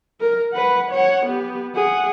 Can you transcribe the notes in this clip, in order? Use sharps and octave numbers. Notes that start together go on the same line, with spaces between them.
A#4
B4 F#5
C#5 F#5
B3 G4
G#4 F#5